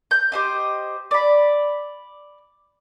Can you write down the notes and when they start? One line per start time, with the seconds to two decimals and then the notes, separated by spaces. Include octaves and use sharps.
0.11 G6
0.32 G4 C5 D#5
1.11 D5 B5